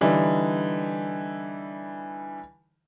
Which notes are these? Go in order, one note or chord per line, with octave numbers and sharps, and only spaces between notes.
D3 E3 G3 D#4